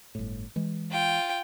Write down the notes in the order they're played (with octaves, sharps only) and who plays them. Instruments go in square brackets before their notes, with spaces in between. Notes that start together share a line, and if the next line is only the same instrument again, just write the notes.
[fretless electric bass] G1 A2
E3 G#3
[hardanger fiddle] F4 G5